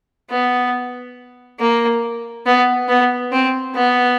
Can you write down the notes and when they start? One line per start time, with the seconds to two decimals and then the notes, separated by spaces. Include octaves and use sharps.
0.30 B3
1.60 A#3
2.46 B3
2.88 B3
3.32 C4
3.75 B3